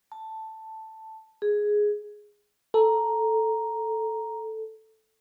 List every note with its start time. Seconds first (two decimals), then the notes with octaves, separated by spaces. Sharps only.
0.12 A5
1.42 G#4
2.74 A4 A#5